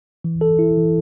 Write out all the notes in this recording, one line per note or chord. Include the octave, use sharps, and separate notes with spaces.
E3
A4
E4
E3